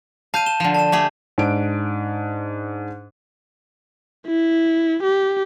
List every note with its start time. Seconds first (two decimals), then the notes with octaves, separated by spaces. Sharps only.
0.34 F5 A5 G6 D#7
0.46 E7 G7
0.60 D3 F3
0.74 A5 E7
0.92 A3 G4 G#4
1.38 G#2 D4 D7
4.27 E4
5.04 G4